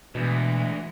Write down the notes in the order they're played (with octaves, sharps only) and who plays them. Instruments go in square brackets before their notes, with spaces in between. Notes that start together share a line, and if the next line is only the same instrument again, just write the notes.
[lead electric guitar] D2 [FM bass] B2 [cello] E3 G#3